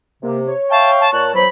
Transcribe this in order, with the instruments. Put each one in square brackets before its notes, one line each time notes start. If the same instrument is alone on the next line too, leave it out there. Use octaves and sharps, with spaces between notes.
[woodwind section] C3 [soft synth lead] A#3
[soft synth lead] C#5
[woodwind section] E5 F5 G5 [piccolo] A5 [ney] C#6
[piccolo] A5
[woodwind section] A#2 A5 [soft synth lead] C#5 [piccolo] F#6
[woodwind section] E2 F#3 [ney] C5 [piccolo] B5